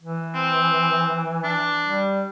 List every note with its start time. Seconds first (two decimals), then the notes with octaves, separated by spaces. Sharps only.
0.02 E3
0.34 C4
1.44 D4
1.87 G3